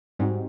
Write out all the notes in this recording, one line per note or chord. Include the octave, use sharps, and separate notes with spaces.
G#2 G3 C4 D#4 F#4